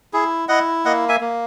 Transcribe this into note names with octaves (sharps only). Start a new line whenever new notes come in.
E4 G#4
E4 D#5 F#5
A#3 D#5 F#5
E5 G#5
A#3